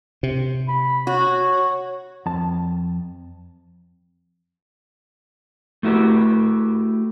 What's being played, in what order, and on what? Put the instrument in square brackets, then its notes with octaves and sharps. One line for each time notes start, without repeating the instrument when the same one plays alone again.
[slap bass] C3
[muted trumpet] B5
[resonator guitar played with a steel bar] F#4 [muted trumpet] C#5
[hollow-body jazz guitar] F2 A5
[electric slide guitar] A3 E4 F#4 G4